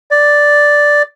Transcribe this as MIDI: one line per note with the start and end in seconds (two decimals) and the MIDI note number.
0.11 1.03 74